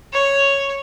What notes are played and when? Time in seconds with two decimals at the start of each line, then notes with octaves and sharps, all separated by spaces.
0.13 C#5